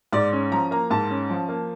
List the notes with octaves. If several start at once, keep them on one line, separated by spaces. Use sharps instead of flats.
G#2 D5
C#4
F3 A#5
A#3 A#5
G#2 A5
C#4
F3
A#3